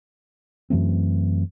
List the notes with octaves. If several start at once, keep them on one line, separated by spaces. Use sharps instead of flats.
F#2 E3 A3 C4